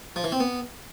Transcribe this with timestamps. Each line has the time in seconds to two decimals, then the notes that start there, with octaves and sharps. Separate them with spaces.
0.16 F3
0.24 E3
0.32 C4
0.40 B3